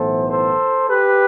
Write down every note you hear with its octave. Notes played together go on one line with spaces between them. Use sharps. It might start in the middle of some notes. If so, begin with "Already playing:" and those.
Already playing: B1 A2 E3 B3 A4 C5
A4 C5
G4 B4